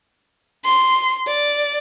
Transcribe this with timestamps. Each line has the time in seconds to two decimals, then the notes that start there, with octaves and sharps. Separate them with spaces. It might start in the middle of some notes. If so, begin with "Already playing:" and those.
0.65 C6
1.27 D5